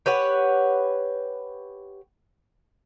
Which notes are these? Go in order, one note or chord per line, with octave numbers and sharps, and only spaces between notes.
G4 B4 C#5 F#5